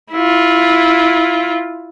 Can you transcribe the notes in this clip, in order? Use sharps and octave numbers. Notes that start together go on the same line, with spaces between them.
E4 F4